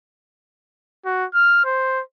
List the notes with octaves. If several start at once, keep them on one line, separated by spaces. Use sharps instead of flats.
F#4
F6
C5